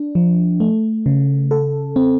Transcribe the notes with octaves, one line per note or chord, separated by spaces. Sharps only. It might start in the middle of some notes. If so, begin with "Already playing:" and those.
Already playing: D4
F3
A3
C#3
A4
C4